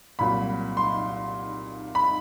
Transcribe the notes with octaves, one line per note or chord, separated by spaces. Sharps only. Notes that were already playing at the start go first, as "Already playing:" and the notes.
C2 A#2 F#3 B5
C6
B5